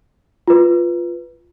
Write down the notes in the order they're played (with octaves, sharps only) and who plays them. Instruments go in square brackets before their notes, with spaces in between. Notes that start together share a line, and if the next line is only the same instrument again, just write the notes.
[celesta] F4 B4